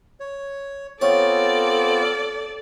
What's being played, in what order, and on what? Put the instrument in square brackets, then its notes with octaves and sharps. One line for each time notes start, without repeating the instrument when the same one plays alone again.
[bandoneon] C#5
[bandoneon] B3 C4 F4 [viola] A4 D5 [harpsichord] C#5